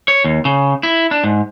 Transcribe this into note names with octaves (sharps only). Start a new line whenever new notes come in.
C#5
D#2
C#3
E4
D4
G#2